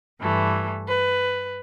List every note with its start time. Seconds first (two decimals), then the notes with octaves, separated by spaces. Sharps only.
0.19 G2 E3 A3
0.87 B4